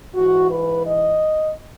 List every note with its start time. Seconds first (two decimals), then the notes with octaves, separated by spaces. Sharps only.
0.14 G#2 E3 F#4
0.51 B4
0.87 D#5